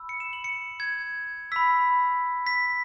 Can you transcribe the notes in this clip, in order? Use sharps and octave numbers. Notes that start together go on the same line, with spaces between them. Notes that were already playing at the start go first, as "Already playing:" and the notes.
Already playing: B5 E6
C#7
E7
F#7
C#7
G#6
B5 E6 B6
B6